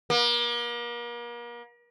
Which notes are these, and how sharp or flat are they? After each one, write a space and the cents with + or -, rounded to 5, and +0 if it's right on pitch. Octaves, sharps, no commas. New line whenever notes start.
A#3 +40